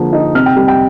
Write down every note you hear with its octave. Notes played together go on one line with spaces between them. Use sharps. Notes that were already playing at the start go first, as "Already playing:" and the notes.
Already playing: D3 F3 G#3 A#3
D#4
C3 F6
G5
G3
G5